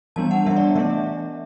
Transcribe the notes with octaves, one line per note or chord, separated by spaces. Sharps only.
E3 G3 B3 D4 A5
F#5
E3 G3 B3 D4 E5
D5
E3 A3 D4 E5